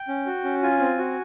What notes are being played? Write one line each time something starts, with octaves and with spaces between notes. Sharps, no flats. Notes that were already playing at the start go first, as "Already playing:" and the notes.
Already playing: G5
C#4
F#4
C#4
F4 G#5
C4
F#4